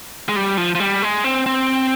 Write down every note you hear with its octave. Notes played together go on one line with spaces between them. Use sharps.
G#3
G3
F3
F3
G3
G#3
C4
C4